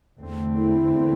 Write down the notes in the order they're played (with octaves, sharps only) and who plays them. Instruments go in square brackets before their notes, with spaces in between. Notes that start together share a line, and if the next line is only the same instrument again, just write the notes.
[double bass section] E2 D3 A3 C4
[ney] E4